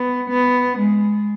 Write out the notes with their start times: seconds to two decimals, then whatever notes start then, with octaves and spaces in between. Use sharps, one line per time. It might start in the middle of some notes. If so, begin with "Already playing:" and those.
Already playing: B3
0.29 B3
0.77 G#3